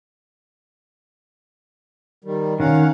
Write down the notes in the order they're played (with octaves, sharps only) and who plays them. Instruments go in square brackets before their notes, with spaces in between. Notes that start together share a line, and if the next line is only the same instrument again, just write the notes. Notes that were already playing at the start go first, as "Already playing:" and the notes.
[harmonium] D#3 G3
[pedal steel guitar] D#3 [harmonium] C#4 F5 F#5